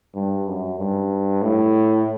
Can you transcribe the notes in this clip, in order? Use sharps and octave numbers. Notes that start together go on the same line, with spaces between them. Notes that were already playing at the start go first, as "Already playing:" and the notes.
G2
F#2
G2
A2